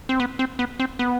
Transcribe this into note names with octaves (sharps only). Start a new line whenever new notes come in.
C4
B3
C4
B3
C4
B3